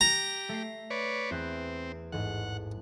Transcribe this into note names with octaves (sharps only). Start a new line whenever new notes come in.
G4 A#5
A3 B6 C7
B4 C#5 D5
E2 C4 F#6 G6
A1 G#2 F#5